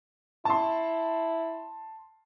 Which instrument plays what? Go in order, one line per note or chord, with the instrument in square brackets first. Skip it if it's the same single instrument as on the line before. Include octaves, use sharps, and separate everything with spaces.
[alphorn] E4 [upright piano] A5 C6